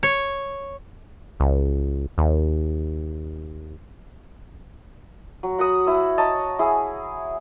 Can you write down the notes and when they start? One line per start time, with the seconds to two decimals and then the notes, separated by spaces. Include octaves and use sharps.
0.03 C#5
1.40 C#2
2.18 D#2
5.43 F#3
5.58 F#4 F#5 B5 D#6
5.87 E4 E6
6.18 C#5 D#5 A5 A#5
6.59 E4 G#4